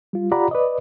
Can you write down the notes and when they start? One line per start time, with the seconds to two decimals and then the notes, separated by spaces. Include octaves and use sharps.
0.13 G3 F4
0.31 F4 G4 D5 F#5 A#5 B5
0.51 B4 D5 D#5